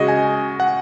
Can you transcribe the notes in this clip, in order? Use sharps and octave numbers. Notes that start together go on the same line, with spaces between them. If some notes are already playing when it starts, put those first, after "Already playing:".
Already playing: C#3 G#3 F#4 G#4 D#5
G#5
F#5